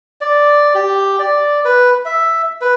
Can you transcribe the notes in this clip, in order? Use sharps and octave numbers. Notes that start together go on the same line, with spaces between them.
D5
G4
D5
B4
E5
B4